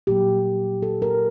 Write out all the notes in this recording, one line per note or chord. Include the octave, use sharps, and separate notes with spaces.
A#2 F#3 A#3 G4
A4
A#4